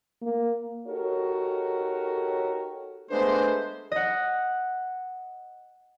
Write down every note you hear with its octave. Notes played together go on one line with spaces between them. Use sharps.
A#3
D#4 F#4 G4 A4 A#4 C#5
G#3 A3 B3 D4 B4 C5
D#5 F#5